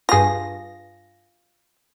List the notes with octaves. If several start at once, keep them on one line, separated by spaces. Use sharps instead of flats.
G2 F4 G#4 A#6